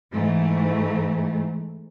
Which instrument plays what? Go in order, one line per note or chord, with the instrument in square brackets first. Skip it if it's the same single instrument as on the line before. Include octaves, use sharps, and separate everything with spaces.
[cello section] G#2 E3 A3